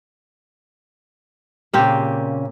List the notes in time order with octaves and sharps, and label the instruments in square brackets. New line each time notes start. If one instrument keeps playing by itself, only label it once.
[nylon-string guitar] A#2 C#3 [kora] A#3 C4 G4